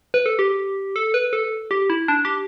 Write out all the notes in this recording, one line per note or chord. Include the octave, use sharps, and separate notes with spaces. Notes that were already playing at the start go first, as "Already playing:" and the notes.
B4
A4
G4
A4
B4
A4
G4
E4
D4
G4